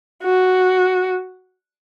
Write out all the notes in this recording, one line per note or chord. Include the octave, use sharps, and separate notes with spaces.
F#4